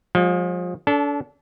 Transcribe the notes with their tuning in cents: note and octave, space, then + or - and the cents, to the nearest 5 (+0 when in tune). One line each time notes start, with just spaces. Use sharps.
F3 +30 G#3 -35
D4 -35 A4 -5